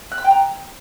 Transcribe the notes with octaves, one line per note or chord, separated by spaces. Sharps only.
F#6
B5
G5
A#5